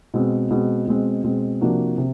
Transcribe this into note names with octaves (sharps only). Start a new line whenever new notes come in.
B2 G#3 C4
B2 G#3 C4
B2 G#3 C4
B2 G#3 C4
C3 F3 A#3 D4 F#4
C3